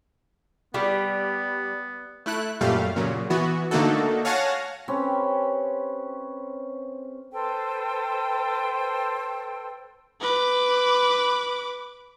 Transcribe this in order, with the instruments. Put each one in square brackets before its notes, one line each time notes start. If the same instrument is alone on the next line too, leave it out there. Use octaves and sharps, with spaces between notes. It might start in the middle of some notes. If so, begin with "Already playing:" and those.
[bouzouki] G3 [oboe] B3
[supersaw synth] A3 E4 F#6
F#2 A#2 G3 A3 F5
A#2 C#3 F#3
E3 B3 F#4
D3 A3 A#3 D#4 F#4 A4
C#5 F5 F#5 G#5 A5 A#6
[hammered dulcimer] C4 C#4 G4 B4
[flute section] A4 B4 C5 G5
[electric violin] B4 D6